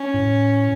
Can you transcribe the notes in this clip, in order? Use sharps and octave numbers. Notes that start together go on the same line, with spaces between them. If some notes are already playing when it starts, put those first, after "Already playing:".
Already playing: C#4
A2